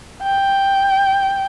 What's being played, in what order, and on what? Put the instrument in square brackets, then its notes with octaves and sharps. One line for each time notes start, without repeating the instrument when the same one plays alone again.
[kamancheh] G5